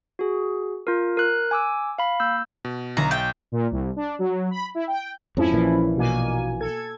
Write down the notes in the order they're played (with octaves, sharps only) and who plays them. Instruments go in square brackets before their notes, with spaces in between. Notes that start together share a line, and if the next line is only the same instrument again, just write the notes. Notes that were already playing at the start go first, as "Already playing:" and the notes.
[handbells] F#4 G#4
F4 A#4
A#4 F#6
G#5 D6 E6
F5 B5
A#3 E6 G6
[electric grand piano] B2
[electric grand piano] B1 [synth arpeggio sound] D3 E3 [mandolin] A#5
[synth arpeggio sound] E5 A6 [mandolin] G5
[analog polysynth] A#2
C2
D4
F#3
B5
E4
G5
[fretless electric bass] F2 G#2 [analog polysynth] F3 C#4 E4
[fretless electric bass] A#1 A#2 E3
[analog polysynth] B2 A#3 G#5
A4 G#6